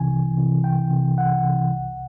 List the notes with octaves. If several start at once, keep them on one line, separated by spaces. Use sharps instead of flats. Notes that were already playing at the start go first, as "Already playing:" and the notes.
Already playing: C2 C3 E3 G#5
C2
C3 E3
C2 G5
C3 E3
C2 F#5
C3 E3
C2